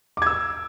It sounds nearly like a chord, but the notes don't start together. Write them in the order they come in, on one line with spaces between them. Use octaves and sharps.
D6 G#6 E6